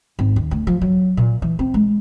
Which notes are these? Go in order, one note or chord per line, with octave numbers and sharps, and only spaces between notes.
G#1
D#2
D2
F3
F#3
A#2
E3
C4
G#3